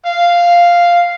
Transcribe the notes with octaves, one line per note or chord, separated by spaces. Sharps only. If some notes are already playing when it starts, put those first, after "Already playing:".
F5